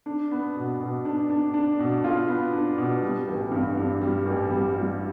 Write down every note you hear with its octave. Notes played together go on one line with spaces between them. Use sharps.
D4
B3
B2
B2
D4
D4
D4
B2
F4
B3
D4
B2
G3
A1
G2
G2
G3
A1
G3
G3